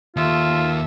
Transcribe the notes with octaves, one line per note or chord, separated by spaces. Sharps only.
D#2 F4 A4 E5